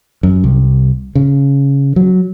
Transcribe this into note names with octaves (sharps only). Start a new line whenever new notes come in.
F#2
C2
C#3
F#3